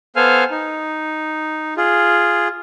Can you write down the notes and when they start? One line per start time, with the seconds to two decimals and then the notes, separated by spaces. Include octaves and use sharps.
0.16 B3 A4 C5 F5 G#5 F6
0.51 D#4
1.77 F4 G#4